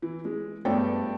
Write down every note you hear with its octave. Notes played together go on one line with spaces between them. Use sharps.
E3
G#3
G2 A3 B3 C5 D5 G5